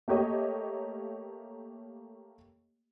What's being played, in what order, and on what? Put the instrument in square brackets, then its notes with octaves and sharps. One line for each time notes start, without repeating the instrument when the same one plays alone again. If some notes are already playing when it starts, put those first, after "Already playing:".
[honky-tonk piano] A3 A#3 G4 C#5 D#5